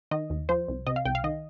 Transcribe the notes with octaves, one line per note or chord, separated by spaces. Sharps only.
D#3 D#5
D#2
F3 C5
C2
C3 D#5
F5
C2 G5
F5
D#3 D#5